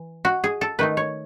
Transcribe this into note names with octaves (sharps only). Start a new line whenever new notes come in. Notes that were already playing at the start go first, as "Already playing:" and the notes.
Already playing: E3
F#4
G#4
A4
D#3 A3 D#4 B4
C#5